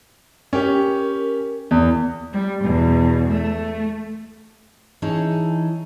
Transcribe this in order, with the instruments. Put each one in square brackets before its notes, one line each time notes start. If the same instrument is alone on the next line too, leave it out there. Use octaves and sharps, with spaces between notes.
[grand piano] C#4 G4 [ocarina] A#4
[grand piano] E2
[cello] G3
E2 B2
A3
[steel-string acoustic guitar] E3 C#4 D#4 E4 G#4 A4